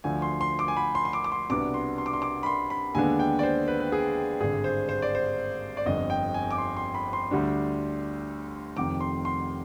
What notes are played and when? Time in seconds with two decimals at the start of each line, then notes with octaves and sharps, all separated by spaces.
0.04 D2 D3 F3 G#5
0.22 C6
0.41 C6
0.59 D6
0.68 G#5
0.77 B5
0.95 C6
1.05 C6
1.13 D6
1.24 D6
1.32 C6
1.50 C2 B2 B3 D4 D6
1.74 C6
1.98 C6
2.06 D6
2.13 C6
2.22 D6
2.43 B5
2.46 C6
2.70 B5
2.94 D#2 D3 G#3 B3 D4 G#5
3.19 G5
3.39 D5
3.43 C5
3.68 B4
3.80 B4
3.92 G#4
4.40 G#1 G2 D3 G#4
4.64 C5
4.89 C5
5.02 D5
5.15 C5
5.77 D5
5.86 G1 F2 D3 D#5
6.10 G5
6.34 G#5
6.51 D6
6.58 C6
6.77 C6
6.95 B5
7.13 C6
7.31 D2 D3 G3 D4
8.77 F1 F2 D#3 D6
9.01 C6
9.25 C6